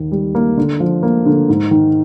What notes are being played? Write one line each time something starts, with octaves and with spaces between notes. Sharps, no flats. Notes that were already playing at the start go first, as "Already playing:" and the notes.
Already playing: D#2 D#3
G3
A#3
D3
F3
A#3
D3
G#2
D#3